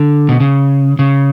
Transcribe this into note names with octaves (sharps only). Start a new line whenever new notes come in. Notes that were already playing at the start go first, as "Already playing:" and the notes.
Already playing: D3
B2
C#3
C#3